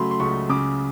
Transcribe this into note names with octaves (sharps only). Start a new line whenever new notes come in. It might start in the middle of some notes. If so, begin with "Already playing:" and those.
Already playing: C#3 F#3 A3 B5 C6
C6
C#2 C#6
C#3 D6